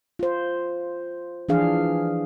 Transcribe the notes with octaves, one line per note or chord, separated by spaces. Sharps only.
F4 C5
E3 F3 D4 G#4 F5